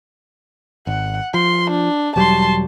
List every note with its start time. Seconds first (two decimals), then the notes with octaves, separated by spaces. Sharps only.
0.87 G#1 F#5
1.34 F3 C6
1.70 D4
2.16 E1 F#3 G3 A5 C6